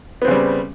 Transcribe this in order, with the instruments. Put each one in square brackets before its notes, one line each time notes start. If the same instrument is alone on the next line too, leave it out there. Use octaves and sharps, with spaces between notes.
[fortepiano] B3
C4
C#3
G3